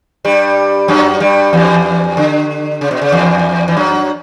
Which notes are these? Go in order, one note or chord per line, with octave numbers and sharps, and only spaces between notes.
G2 G3
F#2 F#3
G2 G3
E2 E3
D3
C#3
B2
C#3
E2 E3
E3
F#2 F#3